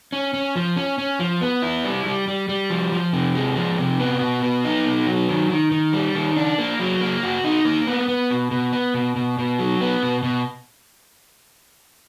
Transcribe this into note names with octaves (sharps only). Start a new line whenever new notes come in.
C#4
C#4
F3
C#4
C#4
F3
B3
E4
G3
G3
G3
G3
F3
F3
C3
G#3
F3
C3
B3
B2
B3
D#4
B2
F#3
D#3
D#3
D#3
G3
D#3
D4
A#3
F#3
A#3
F#4
D#4
A#3
B3
B3
B2
B2
B3
B2
B2
B2
F#3
B3
B2
B2